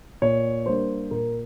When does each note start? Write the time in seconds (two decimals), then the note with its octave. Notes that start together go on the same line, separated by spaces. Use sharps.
0.22 A#2 C#5
0.66 G3 A#3 D4 C5
1.11 A#2 A#4